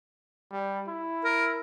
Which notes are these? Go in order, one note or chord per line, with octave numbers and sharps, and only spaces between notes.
G3
E4
A#4